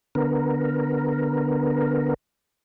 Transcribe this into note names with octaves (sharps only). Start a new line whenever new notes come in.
D3 B3 A#4